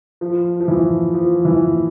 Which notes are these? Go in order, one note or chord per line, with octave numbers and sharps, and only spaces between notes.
F3
F3
E3
F3
E3